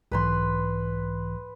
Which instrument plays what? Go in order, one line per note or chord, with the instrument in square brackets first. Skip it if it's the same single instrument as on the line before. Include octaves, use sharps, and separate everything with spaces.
[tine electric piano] B1 G#2 E3 [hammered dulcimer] B4 B5 C6